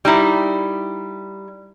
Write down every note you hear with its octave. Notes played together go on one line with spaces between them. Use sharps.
G3 D#4 E4